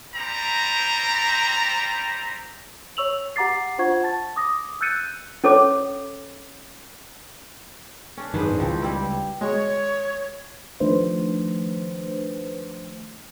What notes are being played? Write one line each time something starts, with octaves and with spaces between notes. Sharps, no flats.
G3 C4 A#5
C#5 C#6 E6 F7 F#7
G4 F#5 A#5 D6 A6 C7
D4 F4 C5 F#5 C#6 G#6
A5 A6
D6 D#6 A#6
E6 F#6 G6 A6 C#7 D#7
C#4 A4 C#5 D6
C#4 D4
G#1 F#2 D#3 G#4 B4 C5
C#2 E3 F3 C4
G3 C4 E4
G#3 C#5
D#3 F3 A3 D4 B4 C5